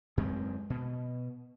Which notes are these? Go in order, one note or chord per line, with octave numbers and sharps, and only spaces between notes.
F#2 G#3 A3 C4
B2